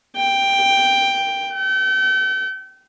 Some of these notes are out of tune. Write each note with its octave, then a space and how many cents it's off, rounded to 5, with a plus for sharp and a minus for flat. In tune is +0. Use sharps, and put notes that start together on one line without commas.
G5 +5
G5 -40